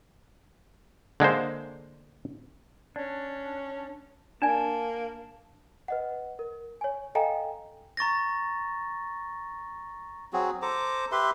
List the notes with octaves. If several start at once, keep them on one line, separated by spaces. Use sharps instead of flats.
D3 G#3 A#3 C5
C#4 D4 D5
A#3 D4 D5 G#5 A5
B4 D#5 F#5
A#4
C#5 G#5
A4 D#5 F5 G5 G#5 A#5
A#5 C#6 A6 A#6
F#3 C4 F#4 G#4
A4 C5 A#5 D6
G4 B4 E5 C6